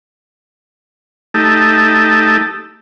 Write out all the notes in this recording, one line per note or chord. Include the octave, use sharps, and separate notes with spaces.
A3 D#4 G4 A4